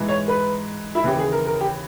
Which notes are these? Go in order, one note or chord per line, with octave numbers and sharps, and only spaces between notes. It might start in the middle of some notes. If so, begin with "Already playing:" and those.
Already playing: G#2 E3
C#5
B4
E4
D#2 C#3 E3 G4
G#4
A#4
A#4
G4